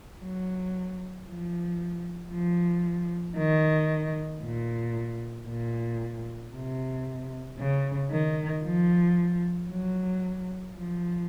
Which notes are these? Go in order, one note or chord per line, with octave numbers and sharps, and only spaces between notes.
F#3
F3
F3
D#3
A#2
A#2
C3
C#3
D#3
F3
F#3
F3